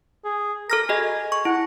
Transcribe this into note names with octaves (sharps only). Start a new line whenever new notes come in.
G#4
A4 A#4 F6 A#6
F#4 G#4 D#5 G#5
C#6
E4 F#5